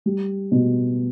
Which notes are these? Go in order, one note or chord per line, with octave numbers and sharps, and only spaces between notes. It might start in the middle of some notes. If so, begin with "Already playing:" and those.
G3
B2